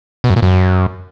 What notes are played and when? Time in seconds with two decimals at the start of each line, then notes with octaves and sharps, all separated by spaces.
0.24 B2
0.30 F#2
0.36 A#2
0.42 F#2